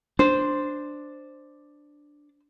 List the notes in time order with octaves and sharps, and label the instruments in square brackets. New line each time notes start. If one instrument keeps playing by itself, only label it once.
[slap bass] D4 [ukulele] C5